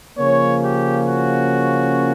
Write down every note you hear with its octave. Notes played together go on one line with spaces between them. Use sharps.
C#3 F3 A#3 C#4 C#5
G4
F#4